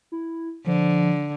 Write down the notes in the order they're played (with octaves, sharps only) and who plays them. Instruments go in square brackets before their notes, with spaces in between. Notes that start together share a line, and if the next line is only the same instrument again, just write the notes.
[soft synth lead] E4
[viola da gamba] D3 [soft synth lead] F3